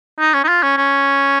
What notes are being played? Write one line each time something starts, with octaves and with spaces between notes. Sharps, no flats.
D#4
C#4
D#4
F4
C#4
C#4